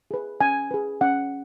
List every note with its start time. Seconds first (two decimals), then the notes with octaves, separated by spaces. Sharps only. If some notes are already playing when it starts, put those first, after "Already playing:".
0.11 G#4 B4
0.41 C#4 G#5
0.71 G#4 B4
1.01 C#4 F#5